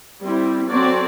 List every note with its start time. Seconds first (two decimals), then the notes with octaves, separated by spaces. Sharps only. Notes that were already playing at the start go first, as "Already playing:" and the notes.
0.21 G3 C4 E4
0.69 F#3 C4 F#4 A4 D5